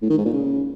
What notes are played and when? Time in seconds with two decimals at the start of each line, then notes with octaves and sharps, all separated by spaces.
0.02 A2
0.10 D#3
0.18 G#2
0.25 A#2
0.33 C#3